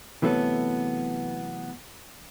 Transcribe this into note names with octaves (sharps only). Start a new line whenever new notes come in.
C3 E3 F#3 A3 B3 A4